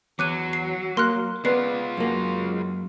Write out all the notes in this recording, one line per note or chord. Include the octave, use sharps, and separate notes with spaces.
E2 F#3 D6 F#6 D#7
C7
A#3 C6 F6 F#6
G#3 B3 F4 B4 D5 C7
F#2 A#3